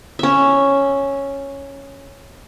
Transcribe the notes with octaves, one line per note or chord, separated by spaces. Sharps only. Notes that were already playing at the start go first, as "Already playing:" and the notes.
C#4 E5